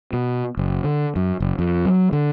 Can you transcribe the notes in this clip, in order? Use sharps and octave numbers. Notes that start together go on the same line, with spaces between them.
B2
F#1
D3
F#2
F#1
F2
F#3
D3